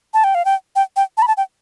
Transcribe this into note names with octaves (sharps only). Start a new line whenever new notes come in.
A5
G5
F5
G5
G5
G5
A5
B5
A5
G5